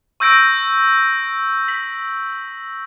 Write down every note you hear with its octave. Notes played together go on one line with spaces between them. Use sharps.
C#6 E6 G6 A#6 D7
B6 F#7